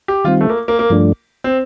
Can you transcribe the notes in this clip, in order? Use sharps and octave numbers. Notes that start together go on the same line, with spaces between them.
G4
D#3 G3 C4 F4
A3
A#3
A#3
A#3
G2 F3 A3 D4
C4